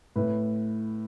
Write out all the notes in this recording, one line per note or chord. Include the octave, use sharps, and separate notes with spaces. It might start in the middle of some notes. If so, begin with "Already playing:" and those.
A2 B4